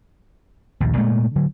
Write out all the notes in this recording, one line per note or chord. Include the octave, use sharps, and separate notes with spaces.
A#1 D#2
A#2 G#3 A3
D3 F#3